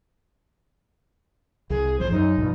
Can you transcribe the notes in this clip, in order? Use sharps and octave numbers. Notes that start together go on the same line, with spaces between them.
C2 G#4
A1 F#2 F3 C5
F#2 D#4
B1 G2 F3